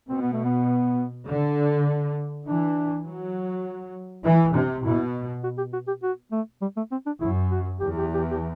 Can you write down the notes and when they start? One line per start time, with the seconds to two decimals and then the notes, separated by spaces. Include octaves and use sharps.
0.09 B2 C4
0.21 B3
0.33 A3
0.44 B3
1.27 D3
2.46 E3 D4
3.05 F#3
4.24 E3 E4
4.53 C3 D4
4.83 B2 E4
5.44 F#4
5.58 G4
5.73 F#4
5.88 G4
6.03 F#4
6.32 A3
6.62 G3
6.77 A3
6.91 C4
7.06 D4
7.21 F#2 E4
7.51 F#4
7.80 E2 G4
7.98 G4
8.14 G4
8.31 G4